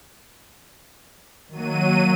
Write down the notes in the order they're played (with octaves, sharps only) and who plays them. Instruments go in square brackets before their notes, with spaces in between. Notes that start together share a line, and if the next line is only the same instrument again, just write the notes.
[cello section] D#3 A#3 [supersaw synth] F#3 D#7